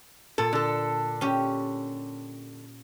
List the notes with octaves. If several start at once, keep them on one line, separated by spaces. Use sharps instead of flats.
A#2 A4
D3 A4
C#4 G4